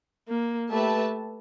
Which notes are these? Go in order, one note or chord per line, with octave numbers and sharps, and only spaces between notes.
A#3
A3 G4 B4 E5 A5